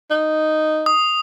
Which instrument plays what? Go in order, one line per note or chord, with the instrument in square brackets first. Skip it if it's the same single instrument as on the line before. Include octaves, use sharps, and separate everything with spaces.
[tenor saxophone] D#4
[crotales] D#6